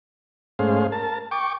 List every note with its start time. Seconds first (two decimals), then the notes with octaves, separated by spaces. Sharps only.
0.59 G#2 A3 C#4 G#4 C5 F5
0.92 A#4 A5
1.31 G5 C#6 D6